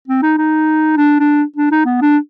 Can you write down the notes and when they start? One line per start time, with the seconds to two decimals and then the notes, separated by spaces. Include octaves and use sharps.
0.08 C4
0.23 D#4
0.38 D#4
0.97 D4
1.20 D4
1.56 D4
1.71 D#4
1.86 B3
2.02 D4